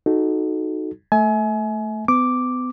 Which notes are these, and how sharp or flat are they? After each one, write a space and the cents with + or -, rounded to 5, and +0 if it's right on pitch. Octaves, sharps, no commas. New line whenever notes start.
D#4 +0 F#4 -5 A4 -15
A3 +0 E5 -30 G#5 +30
B3 +40 D6 +0